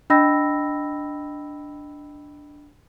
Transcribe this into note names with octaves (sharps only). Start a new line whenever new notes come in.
D4 D#5 G5 B5 E6 A#6